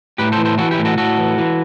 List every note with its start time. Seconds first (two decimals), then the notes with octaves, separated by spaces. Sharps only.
0.18 A2 G4 B4
0.32 A4 C5
0.38 E3
0.45 A4 C5
0.58 E3 F#4 A4
0.71 E4 G4
0.79 A2
0.85 F#4 A4
0.98 A2 F#4 A4
1.18 E3
1.38 E3